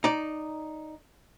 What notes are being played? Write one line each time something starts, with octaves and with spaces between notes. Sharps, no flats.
D#4 D5